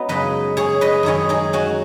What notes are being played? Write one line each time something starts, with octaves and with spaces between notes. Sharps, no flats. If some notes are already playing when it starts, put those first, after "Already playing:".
Already playing: B3 C#4 D#4 F#4
F#2 C#3 G#3 B4 D#5
G#4 C#5
B4 D#5
F#2 D#3 G#3 G#4 C#5
D#4 G#4
C#4 F#4